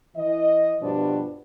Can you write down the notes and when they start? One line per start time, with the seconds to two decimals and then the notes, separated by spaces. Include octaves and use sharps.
0.16 E3 D#5
0.82 G2 B2 F3 G3 B3 D4